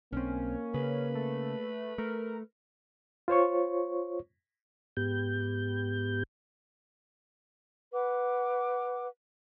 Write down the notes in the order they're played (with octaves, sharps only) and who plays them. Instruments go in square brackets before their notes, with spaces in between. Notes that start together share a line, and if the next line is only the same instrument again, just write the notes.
[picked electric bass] B1 C4 [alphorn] A#3 [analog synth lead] C#4
[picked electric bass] C#3 [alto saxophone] B4
[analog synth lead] A3
[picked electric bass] A3 [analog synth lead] A#4
[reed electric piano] F4 C5 C#5 C#6
[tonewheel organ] G#2 B3 G4 G6
[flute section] B4 F#5 D6